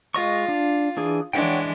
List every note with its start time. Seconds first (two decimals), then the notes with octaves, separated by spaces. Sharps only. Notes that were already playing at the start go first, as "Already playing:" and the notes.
0.15 G#3 F4 D#5 C#6
0.48 D4
0.97 E3 D4 G#4
1.33 E3 G#3 D4 C#5 F#5 G5